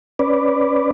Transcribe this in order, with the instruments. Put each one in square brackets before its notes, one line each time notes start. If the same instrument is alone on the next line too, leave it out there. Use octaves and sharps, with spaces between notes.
[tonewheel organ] C#4 B4 D5